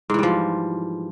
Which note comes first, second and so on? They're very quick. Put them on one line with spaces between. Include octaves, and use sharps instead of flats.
G#2 E3 G3 F3